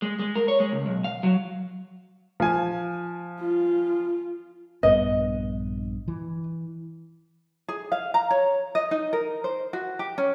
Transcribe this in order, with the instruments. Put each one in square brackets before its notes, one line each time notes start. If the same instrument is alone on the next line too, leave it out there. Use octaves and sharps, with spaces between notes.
[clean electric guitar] G#3
G#3
A#4
C#5
G#3
C#2
B1
F5
F#3
[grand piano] F3 G#5
[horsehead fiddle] F4
[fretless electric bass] A#1 G2 B3 [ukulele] D#5
[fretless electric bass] E3
[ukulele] G#4
F5
A#5
C#5
D#5
D#4
A#4
C5
F#4
G4
C#4